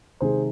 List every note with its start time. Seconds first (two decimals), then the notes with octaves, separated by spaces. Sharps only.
0.21 C3 D#3 G#3 G#4 C5